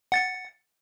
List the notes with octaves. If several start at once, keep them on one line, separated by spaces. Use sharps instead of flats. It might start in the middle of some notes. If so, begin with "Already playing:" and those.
F#5 A6 C#7